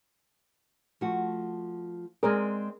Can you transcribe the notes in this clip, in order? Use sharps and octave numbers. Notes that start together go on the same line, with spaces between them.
F3 A3 F#4
G#3 C4 G#4 A#4 D5